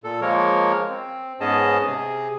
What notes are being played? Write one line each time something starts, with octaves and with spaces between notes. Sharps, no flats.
A#2 A4
F3 G#3 A#3 A#4 C#5
C4
G#2 B3 C#4 G#4 D#5 A5
C3 G#4